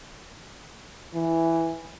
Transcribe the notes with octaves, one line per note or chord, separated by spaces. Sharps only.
E3